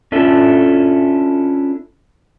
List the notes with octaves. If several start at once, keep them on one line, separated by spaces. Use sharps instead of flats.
C#4 D4 E4 F4 A4